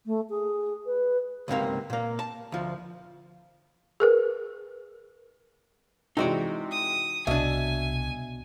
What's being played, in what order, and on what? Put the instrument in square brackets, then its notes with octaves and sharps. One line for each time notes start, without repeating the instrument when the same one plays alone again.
[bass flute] A3
G#4
B4
[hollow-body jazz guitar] C#2 G#2 C3 A#3
A#2 A#3
A5
D2 F3
[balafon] G#4 A#4 B4
[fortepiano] C3 E3 G#3 [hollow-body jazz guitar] D#4 F#4 D5
[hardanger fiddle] D#6
[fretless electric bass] C2 [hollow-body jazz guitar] B2 D4 [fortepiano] E5 [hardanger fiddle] G#5